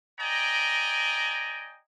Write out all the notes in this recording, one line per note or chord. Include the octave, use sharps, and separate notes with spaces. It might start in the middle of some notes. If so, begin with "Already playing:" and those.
D5 D#5 G5 G#5 A#5